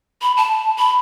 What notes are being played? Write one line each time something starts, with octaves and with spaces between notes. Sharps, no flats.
B5
A5
B5